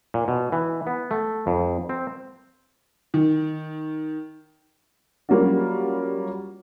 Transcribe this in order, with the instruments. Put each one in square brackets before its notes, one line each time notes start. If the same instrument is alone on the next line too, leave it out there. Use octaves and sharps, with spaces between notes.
[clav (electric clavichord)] A#2
B2
E3
B3
A3
F2
C4
[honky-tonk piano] D#3
F#3 G3 A#3 C#4 F4 F#4